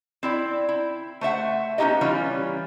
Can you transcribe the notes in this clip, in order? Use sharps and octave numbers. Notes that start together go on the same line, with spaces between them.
C4 E4 D5
E4
A3 C5 E5 F#5
B3 C#4 D#4 E4 G4 D#5
E3 G3 C#4 F4